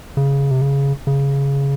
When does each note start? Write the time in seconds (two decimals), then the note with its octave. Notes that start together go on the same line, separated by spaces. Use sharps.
0.17 C#3
0.51 C3
0.61 C#3
1.07 C#3